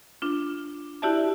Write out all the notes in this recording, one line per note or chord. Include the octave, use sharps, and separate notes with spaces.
D4 F4
E4 F#4 G4 D5 E5 A5